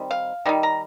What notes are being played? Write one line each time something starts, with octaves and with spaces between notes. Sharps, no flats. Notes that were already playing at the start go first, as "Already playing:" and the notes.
Already playing: D#3 G3 C4 D#4
F5
D#3 G3 D#4
A#5